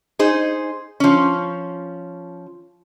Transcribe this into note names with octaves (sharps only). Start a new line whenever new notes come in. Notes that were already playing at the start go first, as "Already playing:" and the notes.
D#4 G#4 C5
F3 C#4